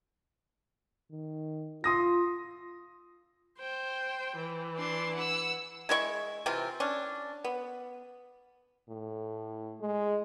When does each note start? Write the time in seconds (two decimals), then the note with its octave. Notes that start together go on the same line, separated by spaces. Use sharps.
1.11 D#3
1.84 F4 C6 D#6 A#6
3.59 C5 G5
4.36 E3
4.76 D4 C6
5.15 F#5 E6
5.89 G#3 E4 C#5 C#6
6.46 C3 E3 C4 F4
6.80 C#4 D4
7.44 B3
8.89 A2
9.81 G#3